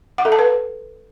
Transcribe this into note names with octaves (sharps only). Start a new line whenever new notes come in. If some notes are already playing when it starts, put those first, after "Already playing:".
F#5
A4
A5
B4